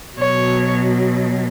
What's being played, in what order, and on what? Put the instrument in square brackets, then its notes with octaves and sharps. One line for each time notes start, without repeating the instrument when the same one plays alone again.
[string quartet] B2 F#3 C#5